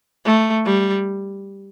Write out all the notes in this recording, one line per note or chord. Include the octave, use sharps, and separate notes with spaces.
A3
G3